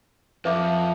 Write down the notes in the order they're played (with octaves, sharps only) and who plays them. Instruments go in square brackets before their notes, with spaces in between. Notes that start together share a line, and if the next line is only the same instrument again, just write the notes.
[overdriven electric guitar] F2 [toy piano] B4 E5 D6